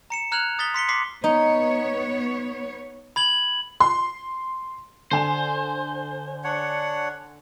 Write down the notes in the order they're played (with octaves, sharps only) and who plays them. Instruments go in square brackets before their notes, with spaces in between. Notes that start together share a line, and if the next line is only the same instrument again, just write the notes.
[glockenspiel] A#5 C#7 E7
A#5 F6 F#6 G#6 F7 F#7
D#6 A6 B6 G7
C6 B6 C#7 G7
C6 D6 B6 C7
[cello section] B3 C#5 [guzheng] D#4
[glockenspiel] B5 G#6 F#7
[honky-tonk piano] C6
[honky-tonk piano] D3 G#5 E7 [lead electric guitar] C5
[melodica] D4 C#5 F#5